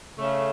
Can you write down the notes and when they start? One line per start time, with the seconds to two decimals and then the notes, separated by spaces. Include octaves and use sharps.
0.18 C#3 A3